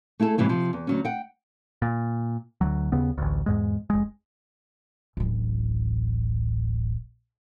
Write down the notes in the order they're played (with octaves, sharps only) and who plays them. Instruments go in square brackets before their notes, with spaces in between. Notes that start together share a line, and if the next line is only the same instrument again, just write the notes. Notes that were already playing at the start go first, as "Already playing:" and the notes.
[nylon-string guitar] A3 E4 G#4 A4
G#2 C3 E3 F#3
C3 F3
E2
D2 F#3 C#4
F#5 G5
[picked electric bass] A#2
D2 F#3
D#2 C#3 B3
A1 D2
E2 G#2 G#3
F1 G#3
[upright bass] D1 A1